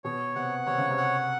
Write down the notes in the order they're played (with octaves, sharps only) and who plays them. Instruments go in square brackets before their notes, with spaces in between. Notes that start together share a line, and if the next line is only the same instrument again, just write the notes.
[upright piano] B2 [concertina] C#5
[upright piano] C3 [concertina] F#5
[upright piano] C3 [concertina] C#5
[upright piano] C#3
C3
[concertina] F#5